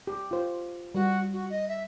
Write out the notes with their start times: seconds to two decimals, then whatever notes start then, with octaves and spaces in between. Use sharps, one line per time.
0.07 G4
0.31 F4 C5
0.95 G3 F#4
1.32 F#4
1.50 D#5
1.68 E5